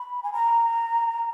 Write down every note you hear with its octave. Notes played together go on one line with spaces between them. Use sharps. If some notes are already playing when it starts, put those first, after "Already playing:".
Already playing: B5
G#5
A#5